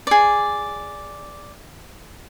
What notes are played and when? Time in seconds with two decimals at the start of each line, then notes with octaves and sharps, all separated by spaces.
0.07 G#4 D5